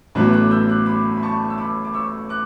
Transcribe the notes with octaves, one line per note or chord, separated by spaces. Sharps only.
A1 A2 F#3 B3 D6 F#6
D6 F#6
E6 G6
D6 F#6
B5 D6
B5
A5 C#6
E6
B5 D6
D6
C#6 E6
D6 F#6